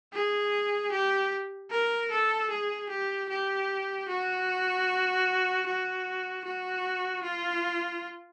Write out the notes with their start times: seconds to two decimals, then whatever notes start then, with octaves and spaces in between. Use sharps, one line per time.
0.13 G#4
0.92 G4
1.71 A#4
2.11 A4
2.50 G#4
2.89 G4
3.29 G4
4.08 F#4
5.66 F#4
6.45 F#4
7.23 F4